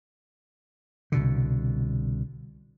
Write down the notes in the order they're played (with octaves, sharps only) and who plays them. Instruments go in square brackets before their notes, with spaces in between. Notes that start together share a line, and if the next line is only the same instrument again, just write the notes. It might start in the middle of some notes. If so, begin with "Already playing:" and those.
[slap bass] C2 B2 D3